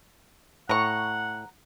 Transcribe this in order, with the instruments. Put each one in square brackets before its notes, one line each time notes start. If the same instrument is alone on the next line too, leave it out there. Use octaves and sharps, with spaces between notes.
[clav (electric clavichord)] A2 [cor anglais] F#5 [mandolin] A#5 C#6